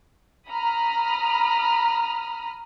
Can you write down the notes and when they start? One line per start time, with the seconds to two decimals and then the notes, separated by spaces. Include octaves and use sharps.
0.49 A#5 B5 D#6 F6